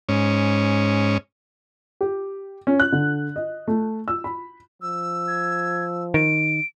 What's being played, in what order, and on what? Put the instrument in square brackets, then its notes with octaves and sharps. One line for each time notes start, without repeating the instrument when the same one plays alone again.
[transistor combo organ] G#2 C#4
[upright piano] G4
C#4
F#6
D3
D#5
A3
E6
B5
[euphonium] F3 [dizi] E6
[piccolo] G#6
[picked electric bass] D#3 [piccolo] D7